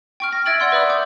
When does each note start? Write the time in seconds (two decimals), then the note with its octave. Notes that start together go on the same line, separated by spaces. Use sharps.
0.20 G5 C#6 F6
0.32 A#6
0.46 E5 E6 G#6 A6 D7 F#7
0.60 D5 F#5 C6 E6
0.72 B4 E5 B5 D#6 E6
0.90 D6 G6